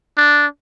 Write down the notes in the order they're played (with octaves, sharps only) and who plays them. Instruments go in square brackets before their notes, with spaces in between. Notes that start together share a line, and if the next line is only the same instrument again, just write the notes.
[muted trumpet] D4